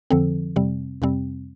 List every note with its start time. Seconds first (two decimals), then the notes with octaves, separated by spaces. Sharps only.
0.10 F2 D3 F3 C4 A4
0.56 F2 C3 G3 C4
1.02 F2 C3 G3 C4